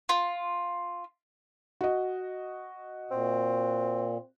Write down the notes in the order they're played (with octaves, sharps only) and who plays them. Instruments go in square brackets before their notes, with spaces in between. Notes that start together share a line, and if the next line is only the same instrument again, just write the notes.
[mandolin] F4
[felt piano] F#4 D#5
[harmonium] A#2 [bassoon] C4